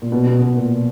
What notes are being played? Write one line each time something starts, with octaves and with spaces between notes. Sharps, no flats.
A#2
B2
B2
B2
A#2